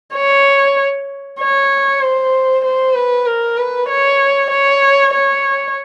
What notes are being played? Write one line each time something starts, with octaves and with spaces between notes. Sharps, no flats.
C#5
C#5
C5
C5
B4
A#4
B4
C#5
C#5
C#5